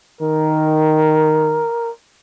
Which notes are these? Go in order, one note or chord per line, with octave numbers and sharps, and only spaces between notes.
D#3 A#4